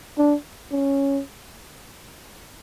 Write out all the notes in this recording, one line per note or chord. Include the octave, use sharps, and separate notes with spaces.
D4
C#4